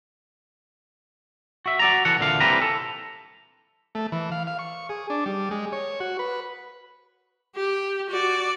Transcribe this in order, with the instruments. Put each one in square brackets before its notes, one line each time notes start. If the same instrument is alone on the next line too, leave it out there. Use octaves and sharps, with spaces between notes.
[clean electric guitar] F#4 E5
F#4 D5 A#5
E3 A4 F#5
D2 A#2 D3 A3 F5
C2 E3 G3 C4 B4 A#5
A4
[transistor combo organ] A3
E3
F5
F5
C#6
G#4
D4
G3
G#3
C#5
F#4
B4
[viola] G4
F#4 D5